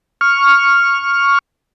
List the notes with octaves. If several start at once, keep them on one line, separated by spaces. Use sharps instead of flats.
C#6 F6